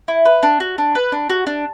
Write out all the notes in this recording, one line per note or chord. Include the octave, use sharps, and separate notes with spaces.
E4
B4
D4
F#4
D4
B4
D4
F#4
D4